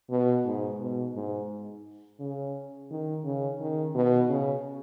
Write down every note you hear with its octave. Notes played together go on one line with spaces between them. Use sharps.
B2
G#2
B2
G#2
C#3
D#3
C#3
D#3
B2
C#3